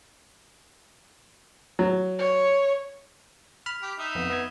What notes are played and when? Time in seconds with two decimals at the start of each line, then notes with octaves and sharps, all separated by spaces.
1.79 F#3
2.19 C#5
3.66 B5 F6
3.83 G4
3.99 D#4 E5
4.15 F2 B3
4.30 B3 G#6